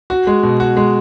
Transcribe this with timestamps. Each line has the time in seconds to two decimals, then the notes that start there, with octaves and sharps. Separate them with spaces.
0.10 F#4
0.27 G#3
0.43 B2
0.60 F#4
0.77 G#3